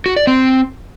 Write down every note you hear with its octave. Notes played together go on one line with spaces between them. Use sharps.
F#4
D5
C4